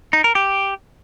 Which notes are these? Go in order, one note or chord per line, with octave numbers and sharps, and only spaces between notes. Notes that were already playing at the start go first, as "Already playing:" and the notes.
D#4
A#4
G4